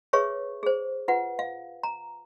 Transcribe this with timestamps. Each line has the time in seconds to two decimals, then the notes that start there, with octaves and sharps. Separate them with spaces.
0.13 G#4 B4 C#5 E5 C#6
0.63 G#4 C5
1.08 F4 B4 F#5
1.39 F5
1.83 A#5